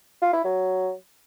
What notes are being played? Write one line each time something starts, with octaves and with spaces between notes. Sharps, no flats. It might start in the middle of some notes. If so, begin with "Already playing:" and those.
F4
E4
F#3